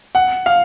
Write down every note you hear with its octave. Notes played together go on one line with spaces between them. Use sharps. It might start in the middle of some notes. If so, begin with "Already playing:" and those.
F#5
F5